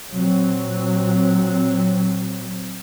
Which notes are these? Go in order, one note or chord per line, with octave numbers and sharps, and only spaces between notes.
A#2 F#3 C4